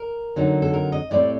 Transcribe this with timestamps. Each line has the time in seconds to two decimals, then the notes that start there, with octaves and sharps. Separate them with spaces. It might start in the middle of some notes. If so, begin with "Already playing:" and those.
Already playing: A#4
0.36 D3 F#3 C4 D#4
0.62 A4
0.73 A#4
0.92 D#5
1.11 A2 G3 C4 D5